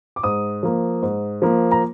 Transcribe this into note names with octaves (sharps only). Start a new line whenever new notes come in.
D6
G#2 D#6
F3 A#3
G#2
F3 A#3
A#5